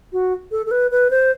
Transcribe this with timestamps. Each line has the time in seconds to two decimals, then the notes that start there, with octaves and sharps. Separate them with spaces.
0.12 F#4
0.51 A4
0.66 A4
0.71 B4
0.91 B4
1.10 C5